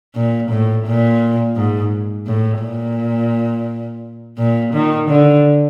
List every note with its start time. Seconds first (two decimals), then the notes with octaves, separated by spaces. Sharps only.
0.15 A#2
0.50 A2
0.86 A#2
1.56 G#2
2.27 A2
2.62 A#2
4.38 A#2
4.74 D#3
5.09 D3